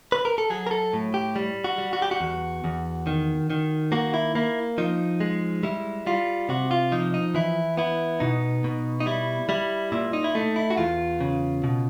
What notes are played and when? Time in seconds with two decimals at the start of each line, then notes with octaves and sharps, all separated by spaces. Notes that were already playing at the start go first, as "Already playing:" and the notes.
0.12 B4
0.25 A#4
0.38 A4
0.50 F#3 G#4
0.67 A#4
0.71 A4
0.93 A2
1.14 G4
1.36 G3
1.64 F#4
1.78 G3
1.93 F#4
2.02 G4
2.11 F#4
2.21 E2
2.64 E2
3.07 D#3
3.50 D#3
3.92 A#3 F#4
4.14 E4
4.35 A#3 E4
4.78 F3 D#4
5.20 G#3
5.63 G3 E4
6.07 G3 F4
6.49 C3 F#4
6.71 F4
6.92 F3 D#4
7.14 D#4
7.35 E3 E4
7.77 B3 E4
8.20 B2 D#4
8.64 B2
9.00 D#4
9.06 G3 E4
9.49 G3 E4
9.92 A#2 E4
10.13 D#4
10.24 E4
10.35 A3 D#4
10.56 E4
10.70 F#4
10.77 E2 F4
11.20 C#3
11.64 B2